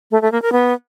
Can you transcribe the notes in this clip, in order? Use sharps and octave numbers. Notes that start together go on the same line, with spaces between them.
A3
A3
A#3
A#4
B3